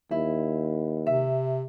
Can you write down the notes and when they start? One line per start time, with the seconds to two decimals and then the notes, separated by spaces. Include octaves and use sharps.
0.11 D#2 E4
1.07 C3 E5